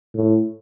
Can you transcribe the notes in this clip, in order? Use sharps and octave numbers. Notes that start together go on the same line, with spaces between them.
A2